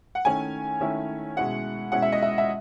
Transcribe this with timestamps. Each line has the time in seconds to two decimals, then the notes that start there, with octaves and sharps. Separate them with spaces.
0.15 F#5
0.25 D#3 A3 C#4 E4 G#5
0.80 D#3 A3 C#4 E4
1.37 B2 G#3 C#4 E4 F#5
1.92 B2 G#3 C#4 E4 F#5
2.02 E5
2.12 D#5
2.23 E5
2.38 E5